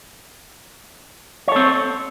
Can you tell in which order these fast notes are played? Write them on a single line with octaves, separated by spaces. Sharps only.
C#5 A4 C4